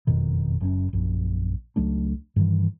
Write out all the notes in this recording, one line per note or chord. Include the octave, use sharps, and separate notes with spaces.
F#1 F2 B2 D#3
F#1 F#2 C#4
A#1 F#2
C#2 F#3 A3 D4
G2 D#3 E3